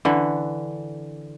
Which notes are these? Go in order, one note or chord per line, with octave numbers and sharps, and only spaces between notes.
D3 E3